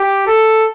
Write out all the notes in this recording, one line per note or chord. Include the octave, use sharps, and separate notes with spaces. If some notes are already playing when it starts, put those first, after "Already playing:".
Already playing: G4
A4